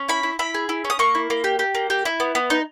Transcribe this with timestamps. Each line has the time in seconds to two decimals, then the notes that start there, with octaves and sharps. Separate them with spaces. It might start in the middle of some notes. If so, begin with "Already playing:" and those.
Already playing: C#4
0.09 E4 B5
0.23 E4
0.39 E4 B5
0.54 G#4
0.69 E4
0.85 C#4
0.90 D#6
0.99 A#3 C#6
1.15 E4
1.30 A#3
1.44 G4
1.59 G4
1.75 A#3
1.90 G4
2.05 E4
2.20 B3
2.35 B3
2.50 D#4